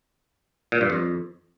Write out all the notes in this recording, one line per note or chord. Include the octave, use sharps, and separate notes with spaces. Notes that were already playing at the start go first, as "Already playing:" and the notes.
A#2
G2
F2